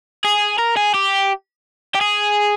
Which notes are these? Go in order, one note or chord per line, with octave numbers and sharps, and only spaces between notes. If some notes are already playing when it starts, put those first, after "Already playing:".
G#4
A#4
G#4
G4
G4
G#4